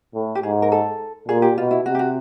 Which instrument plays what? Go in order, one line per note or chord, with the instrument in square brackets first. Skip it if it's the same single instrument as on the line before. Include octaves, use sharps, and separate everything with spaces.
[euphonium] A2
[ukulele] G4
[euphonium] G#2 [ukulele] G#4
[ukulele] A#4
A4
[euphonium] A#2 [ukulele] G#4
[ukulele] G4
[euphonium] B2 [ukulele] F4
[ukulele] E4
[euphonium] C3 [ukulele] F#4
[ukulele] G4
F#4